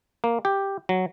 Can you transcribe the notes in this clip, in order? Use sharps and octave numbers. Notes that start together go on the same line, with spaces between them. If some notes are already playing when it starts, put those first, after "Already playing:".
A#3
G4
F#3